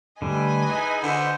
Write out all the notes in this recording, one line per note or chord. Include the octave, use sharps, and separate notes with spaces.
D3 G3 A3 B4 D#5 G#5
D#4 E4 G#4
D3 C5